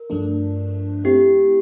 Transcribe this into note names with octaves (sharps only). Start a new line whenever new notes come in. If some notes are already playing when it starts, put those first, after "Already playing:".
Already playing: A#4
G2 F3 A3 D4
A3 C4 E4 G4